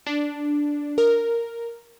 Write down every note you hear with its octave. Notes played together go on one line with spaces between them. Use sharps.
D4
A#4